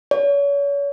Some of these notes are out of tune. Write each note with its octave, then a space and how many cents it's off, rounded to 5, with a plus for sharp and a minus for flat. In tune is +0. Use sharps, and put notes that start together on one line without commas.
C#5 +35